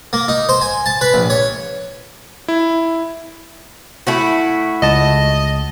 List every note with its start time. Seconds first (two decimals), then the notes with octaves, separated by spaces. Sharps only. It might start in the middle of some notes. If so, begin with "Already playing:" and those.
0.13 A#3
0.28 D#4
0.49 C5
0.62 G#5
0.86 A5
1.01 B4
1.14 A#1
1.30 C#5
2.48 E4
4.07 A3 E4 F#4
4.82 C#2 D#5 A5